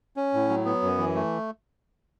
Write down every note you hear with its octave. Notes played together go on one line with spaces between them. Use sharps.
C#4
A2
F#3
B3
F#2
E3
A3